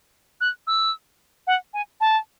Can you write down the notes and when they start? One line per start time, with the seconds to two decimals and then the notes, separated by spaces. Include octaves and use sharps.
0.41 F#6
0.67 E6
1.47 F#5
1.74 G#5
2.01 A5